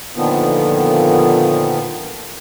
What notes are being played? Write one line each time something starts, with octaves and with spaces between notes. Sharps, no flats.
A#2 D3 D#3 F3 B3